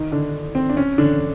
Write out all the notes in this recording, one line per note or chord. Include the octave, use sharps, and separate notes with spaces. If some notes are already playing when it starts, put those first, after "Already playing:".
Already playing: D#3 D#4
D3 D4
C4
D4
C#4
D3 D4